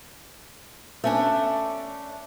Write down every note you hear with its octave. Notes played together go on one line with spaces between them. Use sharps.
A3 C#4 D4